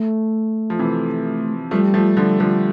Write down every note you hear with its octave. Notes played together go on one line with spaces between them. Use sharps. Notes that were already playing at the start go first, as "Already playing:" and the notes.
Already playing: A3
F3
C3 E3
F3 G3 A3
F3 A3
D3 F3
D3 F3